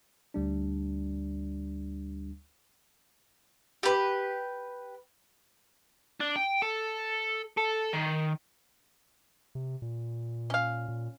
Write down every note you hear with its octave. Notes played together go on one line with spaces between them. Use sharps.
D2 G3 D4
G4 B4
D4
G5
A4
A4
D#3
C3
A#2
C#4 F5
A#2